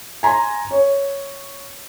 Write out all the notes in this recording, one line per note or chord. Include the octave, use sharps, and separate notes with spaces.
G#5 A#5 C6
C#5